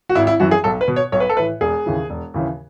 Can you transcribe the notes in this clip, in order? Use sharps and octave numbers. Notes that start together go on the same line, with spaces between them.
F#4
G#1 E4
E4
F#2 E3 F#4
G#4
B1 A4
B4
B2
C#5
B1 C#5
B4
A4
A2 E3 B4
E1 G#4
D#2 C#3 E3
E1
D#2 C#3 E3